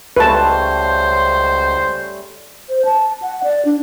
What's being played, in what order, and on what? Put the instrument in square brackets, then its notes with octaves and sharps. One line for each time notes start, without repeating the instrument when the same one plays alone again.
[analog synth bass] C#2 [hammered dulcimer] G3 A3 C#4 [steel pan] B4 A5 [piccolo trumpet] C5
[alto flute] C5
A5
F#5
D5
D4